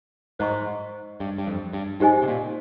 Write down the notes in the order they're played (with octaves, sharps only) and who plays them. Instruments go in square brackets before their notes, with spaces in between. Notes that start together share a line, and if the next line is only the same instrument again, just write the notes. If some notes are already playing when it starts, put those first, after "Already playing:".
[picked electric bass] G#2 [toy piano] C5 D#5 A#5 C#6
[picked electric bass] G2
G2
F2
G2
[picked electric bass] G#2 [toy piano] D#4 G4 C5 D#5 G#5
[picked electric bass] C3
A#2